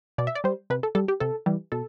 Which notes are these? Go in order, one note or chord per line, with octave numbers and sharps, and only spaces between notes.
B2 D5
E5
D5
G3 C5
C3 B4
A4
G3 A4
G4
C3 A4
E3 G3
B2 A4